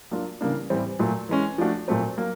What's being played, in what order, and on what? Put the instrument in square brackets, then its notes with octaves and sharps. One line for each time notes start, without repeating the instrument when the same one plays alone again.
[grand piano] F#3 A#3 D4 F4
C#3 E3 G3 A#3 D4
A2 E3 G3 C4
A#2 F#3 A3
E3 G#3 C#4
F3 A3 D4 F#4
A#2 F#3 A3 C4
F#3 A#3